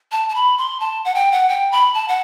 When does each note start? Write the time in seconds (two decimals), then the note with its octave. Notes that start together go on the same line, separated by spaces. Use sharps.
0.12 A5
0.29 A5
0.35 B5
0.58 C6
0.80 A5
1.05 F#5
1.15 G5
1.32 F#5
1.49 G5
1.72 B5
1.94 A5
2.08 F#5